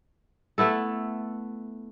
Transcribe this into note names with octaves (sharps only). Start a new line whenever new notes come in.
A3 B3 E4 A4